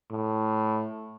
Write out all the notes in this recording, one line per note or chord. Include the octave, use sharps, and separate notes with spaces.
A2